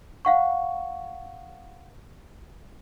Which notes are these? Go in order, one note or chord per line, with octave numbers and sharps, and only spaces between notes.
F5 F#5 C#6